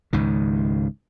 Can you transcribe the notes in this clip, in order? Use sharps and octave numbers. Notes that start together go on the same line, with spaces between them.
C#2 G#2 D#3